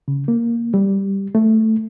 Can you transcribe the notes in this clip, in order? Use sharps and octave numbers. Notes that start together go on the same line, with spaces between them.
C#3
A#3
G3
A3